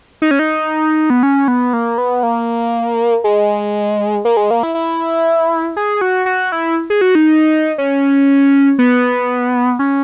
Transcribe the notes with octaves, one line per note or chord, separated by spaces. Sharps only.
D#4
C#4
D#4
B3
C#4
B3
A#3
B3
A#3
G#3
A#3
G#3
A#3
E4
E4
G#4
F#4
F#4
E4
G#4
F#4
D#4
C#4
B3
C#4